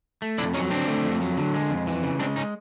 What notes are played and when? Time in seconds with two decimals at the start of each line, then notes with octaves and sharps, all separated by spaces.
0.22 A3
0.38 F2 D4 E4
0.54 F#3 C#4 D#4
0.70 D3 C4 D4
0.88 A3
1.04 F2
1.21 F#3
1.37 D3
1.54 G#3
1.70 F2
1.87 E3
2.03 C#3
2.20 G#3 C4 D4
2.36 C#4 D#4